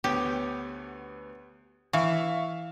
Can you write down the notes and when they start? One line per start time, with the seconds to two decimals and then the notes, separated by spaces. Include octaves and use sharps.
0.04 D2 B3 G4 C#5
1.93 E3 E5 F5 C#6